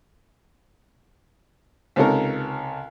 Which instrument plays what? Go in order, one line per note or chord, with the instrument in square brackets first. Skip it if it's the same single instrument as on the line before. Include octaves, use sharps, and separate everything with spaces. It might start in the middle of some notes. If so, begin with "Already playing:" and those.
[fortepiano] C#2 C3 C#4 D#4 A4 A#4